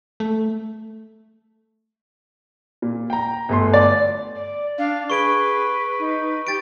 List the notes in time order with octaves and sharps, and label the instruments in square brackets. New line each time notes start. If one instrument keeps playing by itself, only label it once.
[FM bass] A3
[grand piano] A#2
G5 A#5
G1 A3 C6
[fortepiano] D5
[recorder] D5
[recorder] D4 [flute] F5
[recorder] G#4 [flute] B4 [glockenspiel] C#6 D7 G7
[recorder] D#4
[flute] G4 [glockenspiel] A6 D7